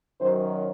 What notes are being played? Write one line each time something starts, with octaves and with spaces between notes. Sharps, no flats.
F#2 D#3 F#3 C5